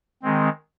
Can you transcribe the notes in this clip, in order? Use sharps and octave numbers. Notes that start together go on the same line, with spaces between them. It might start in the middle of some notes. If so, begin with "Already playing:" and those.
D#3 G#3 C4